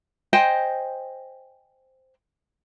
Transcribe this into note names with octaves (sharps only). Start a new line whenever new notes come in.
C5 D#5 G5 G#5